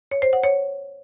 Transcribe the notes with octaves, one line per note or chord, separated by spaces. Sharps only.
C#5
C5
F#5
C#5